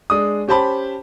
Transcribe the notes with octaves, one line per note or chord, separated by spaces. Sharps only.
G#3 D4 D#6
C#4 G4 C5 A5 B5